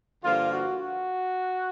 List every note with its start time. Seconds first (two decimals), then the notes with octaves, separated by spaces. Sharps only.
0.24 G2 D3 F3 A#3 F4
0.53 F#4
0.81 F#4